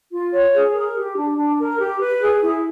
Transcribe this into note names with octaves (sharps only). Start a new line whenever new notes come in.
F4
C#5
G#4
A#4
G4
D4
D4
A#4
G4
B4
G#4
E4